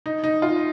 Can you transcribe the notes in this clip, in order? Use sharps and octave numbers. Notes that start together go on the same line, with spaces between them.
D#4
D#4
F4